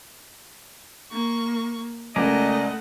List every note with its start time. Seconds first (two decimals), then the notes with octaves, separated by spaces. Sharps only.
1.12 A#3 C#6
2.16 C#2 A3 A#4 D5 D#5 F#5 G#5 A#5